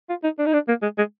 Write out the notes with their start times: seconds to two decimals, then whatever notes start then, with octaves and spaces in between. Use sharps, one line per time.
0.09 F4
0.24 D#4
0.39 D4
0.46 D#4
0.53 D4
0.68 A#3
0.82 G#3
0.98 G#3